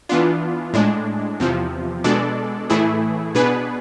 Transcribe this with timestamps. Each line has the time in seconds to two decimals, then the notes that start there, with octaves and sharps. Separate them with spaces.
0.09 E3 B3 D4 F4
0.74 A2 G#3 D4
1.40 E2 C3 F3
2.04 B2 G#3 D4 A4 D5
2.70 A2 E3 A3 E4 G#4
3.35 B2 B3 D4 G#4 B4